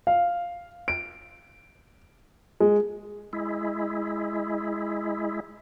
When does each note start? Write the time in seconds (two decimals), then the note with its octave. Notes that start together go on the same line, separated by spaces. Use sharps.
0.07 F5
0.88 D7
2.60 G#3
3.33 G#3 E4